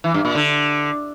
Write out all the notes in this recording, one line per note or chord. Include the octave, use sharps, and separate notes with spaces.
E3
G2
A#2
D3